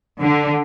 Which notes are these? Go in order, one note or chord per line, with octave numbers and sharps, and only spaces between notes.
D3